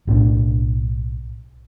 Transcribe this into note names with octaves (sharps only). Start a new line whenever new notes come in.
B1 A2 F3 D4